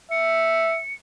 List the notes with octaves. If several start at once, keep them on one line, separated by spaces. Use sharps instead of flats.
E5 C#7